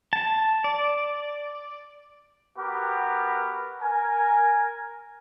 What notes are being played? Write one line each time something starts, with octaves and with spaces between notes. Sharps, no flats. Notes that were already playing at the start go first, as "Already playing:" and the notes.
A5
D5
B3 F#4 G4 A#4 B4
A#4 G#5